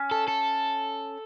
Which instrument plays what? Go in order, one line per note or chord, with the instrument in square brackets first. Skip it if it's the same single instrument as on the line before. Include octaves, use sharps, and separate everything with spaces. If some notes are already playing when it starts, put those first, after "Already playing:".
Already playing: [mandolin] C#4
[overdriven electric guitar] A4
A4